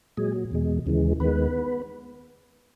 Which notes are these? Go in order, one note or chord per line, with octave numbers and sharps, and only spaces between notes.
A#2 F#3 G#3 G#4
E2 B2 G#3
D#2 C#3 E3 G#3
D#2 D#3 G#3 B3 B4